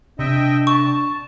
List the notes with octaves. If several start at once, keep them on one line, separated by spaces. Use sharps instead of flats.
C3 D4 D#5 E5 G5
A5 C#6